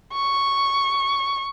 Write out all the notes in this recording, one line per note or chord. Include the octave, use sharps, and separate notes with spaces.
C#6